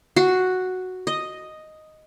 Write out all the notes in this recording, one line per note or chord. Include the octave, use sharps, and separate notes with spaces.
F#4
D#5